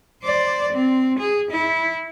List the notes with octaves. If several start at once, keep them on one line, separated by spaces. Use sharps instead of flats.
C5 D5
C4
G#4
E4